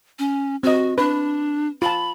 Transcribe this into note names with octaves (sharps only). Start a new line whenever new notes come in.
C#4
C4 F#4 D#5
D4 B4
F4 A5 B5